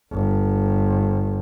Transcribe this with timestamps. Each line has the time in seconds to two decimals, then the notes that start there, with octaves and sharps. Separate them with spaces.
0.12 G1